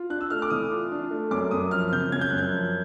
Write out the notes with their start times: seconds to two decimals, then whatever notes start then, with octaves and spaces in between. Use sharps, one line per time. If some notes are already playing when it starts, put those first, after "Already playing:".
Already playing: F4
0.10 D4 F#6
0.21 E6
0.30 A3 F6
0.42 D6
0.50 E3 D#6
0.71 F4
0.92 D4
1.11 A3
1.31 F#2 D6
1.51 F#2 D#6
1.71 F3 F6
1.92 C#3 G6
2.12 F#2 G#6
2.21 G6
2.30 F#2 F#6
2.38 G6
2.52 F3